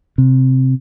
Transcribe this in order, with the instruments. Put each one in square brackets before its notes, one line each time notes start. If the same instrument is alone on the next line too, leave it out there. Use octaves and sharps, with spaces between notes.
[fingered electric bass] C3